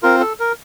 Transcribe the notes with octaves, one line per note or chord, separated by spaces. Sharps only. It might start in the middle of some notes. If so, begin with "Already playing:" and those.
C4 F4 A#4
A4
A#4